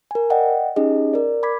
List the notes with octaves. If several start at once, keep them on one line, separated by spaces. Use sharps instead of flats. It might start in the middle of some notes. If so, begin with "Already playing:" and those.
A#4 G#5
D5 D#5 F#5 G5
C#4 D#4 G4 G#4 D#5
A#4 D5
B5 D6 G#6 B6